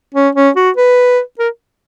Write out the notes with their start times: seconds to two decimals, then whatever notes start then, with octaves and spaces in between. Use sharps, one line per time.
0.15 C#4
0.35 C#4
0.56 F#4
0.77 B4
1.39 A#4